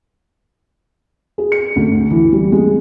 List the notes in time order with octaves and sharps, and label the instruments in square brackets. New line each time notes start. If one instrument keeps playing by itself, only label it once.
[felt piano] G#4
C#7
D2
E3
G3
G#3